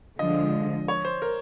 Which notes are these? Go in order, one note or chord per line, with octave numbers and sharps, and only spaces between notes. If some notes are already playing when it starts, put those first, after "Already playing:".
D3 F3 G#3 D#5
C#5
C5
A#4